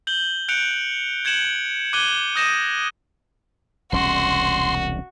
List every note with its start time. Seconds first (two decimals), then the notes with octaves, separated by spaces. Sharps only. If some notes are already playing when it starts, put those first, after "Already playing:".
0.07 G6 F#7 G7
0.48 F#6 G6 C#7 D7 F7
1.25 G6 G#6 C#7 E7 F#7
1.93 D6 F#6 G#6 D#7 G7
2.36 D#6 G6 A#6 D#7 E7
3.92 E1 C2 C#4 F#4 C6